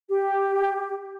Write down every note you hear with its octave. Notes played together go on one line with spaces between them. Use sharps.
G4